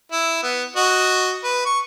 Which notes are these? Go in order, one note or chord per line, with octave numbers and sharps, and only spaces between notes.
E4
B3
F#4 D#5
B4
C#6